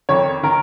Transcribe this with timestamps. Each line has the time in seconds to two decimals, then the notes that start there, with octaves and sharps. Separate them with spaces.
0.09 F2 D#3 C#5
0.43 D#3 A#4